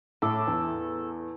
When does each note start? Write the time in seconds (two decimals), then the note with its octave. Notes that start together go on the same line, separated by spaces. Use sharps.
0.22 A2 A4 D6
0.47 E2